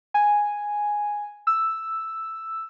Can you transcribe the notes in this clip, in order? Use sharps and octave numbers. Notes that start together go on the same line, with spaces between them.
G#5
E6